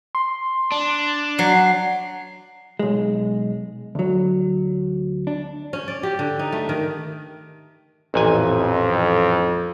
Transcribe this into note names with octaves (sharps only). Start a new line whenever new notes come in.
C6
D4
F#3 C7
B1 G#3
D2 F#3
D4
C#4
D5
G4
D3
D#4
A3
D#3
A1 F2 A#2 G#5